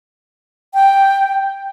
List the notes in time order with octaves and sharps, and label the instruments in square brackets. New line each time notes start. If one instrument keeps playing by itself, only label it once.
[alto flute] G5